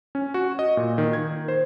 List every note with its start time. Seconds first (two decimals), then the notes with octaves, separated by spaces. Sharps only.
0.15 C#4
0.34 F#4
0.59 D#5
0.77 A#2
0.98 D#3
1.13 G#6
1.48 C5